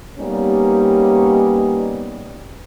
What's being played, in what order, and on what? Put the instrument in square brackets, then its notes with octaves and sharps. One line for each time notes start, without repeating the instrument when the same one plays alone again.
[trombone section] G3 A#3 B3 C#4 D#4 G4